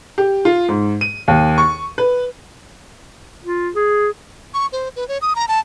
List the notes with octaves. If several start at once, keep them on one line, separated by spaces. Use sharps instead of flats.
G4
F4
G#2
D#7
D#2
C#6
B4
F4
G#4
C#6
C5
B4
C#5
D#6
A#5
A5